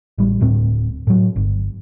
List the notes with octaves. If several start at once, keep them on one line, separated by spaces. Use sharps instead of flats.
A1 G3
D1 A2 C4
A2 F#3
G1